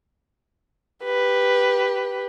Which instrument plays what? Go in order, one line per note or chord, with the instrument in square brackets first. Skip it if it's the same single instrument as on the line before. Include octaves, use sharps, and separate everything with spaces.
[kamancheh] G4 B4